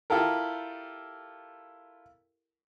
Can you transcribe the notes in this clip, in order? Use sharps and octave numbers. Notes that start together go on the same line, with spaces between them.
E4 F4 G4 A4 A#4